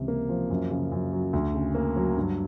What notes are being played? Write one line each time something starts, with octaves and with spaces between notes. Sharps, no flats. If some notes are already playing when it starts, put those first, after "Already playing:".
Already playing: C#2 C3 E3
A#3
F3
F#2
C#3
F#2
F#3
D2
C#3
A#3
F#3
G2